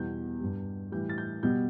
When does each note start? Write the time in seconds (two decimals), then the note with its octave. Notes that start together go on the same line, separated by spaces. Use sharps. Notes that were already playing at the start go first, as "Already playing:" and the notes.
Already playing: E2 B2 G3 G6
0.40 G2 G3
0.92 A2 E3 G3 G6
1.09 A6
1.18 G6
1.43 B2 G3 G6